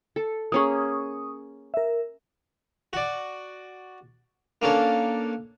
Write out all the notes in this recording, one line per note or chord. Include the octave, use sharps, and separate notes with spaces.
A4
A#3 C#4 G#4 C#6 D#6
A#4 E5
F#4 D5
A#3 C#4 D4 A4